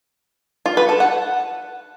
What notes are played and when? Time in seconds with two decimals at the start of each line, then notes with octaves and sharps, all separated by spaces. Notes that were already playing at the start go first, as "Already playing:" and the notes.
0.66 F4
0.77 B4
0.89 A4
1.00 F#5